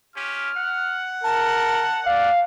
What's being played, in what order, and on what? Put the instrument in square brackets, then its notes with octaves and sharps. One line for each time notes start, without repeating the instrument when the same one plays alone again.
[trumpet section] C#4 F4 G4 [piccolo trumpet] F6
[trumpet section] F#5
[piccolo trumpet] A#4 [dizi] A5
[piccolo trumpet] D5 [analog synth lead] F5